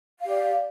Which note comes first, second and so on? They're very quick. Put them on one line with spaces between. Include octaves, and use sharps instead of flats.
F5 G4 D5